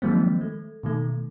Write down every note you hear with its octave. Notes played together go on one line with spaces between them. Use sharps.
D#3 F3 F#3 G#3 A#3 C4
A3
B2 D#3 A3